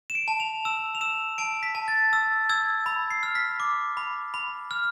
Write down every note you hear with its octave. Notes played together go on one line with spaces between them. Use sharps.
E7
D7
A5
F7
E6 E7
F7
E6 E7
A5 D7
B6
A5
A6
E6
E6 G#6
B5
C7
F6
B6
D6
B5
B5
F6